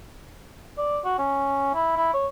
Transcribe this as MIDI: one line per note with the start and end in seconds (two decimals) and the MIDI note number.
0.78 1.00 74
1.04 1.17 66
1.18 1.70 61
1.74 1.95 64
1.96 2.12 64
2.14 2.28 73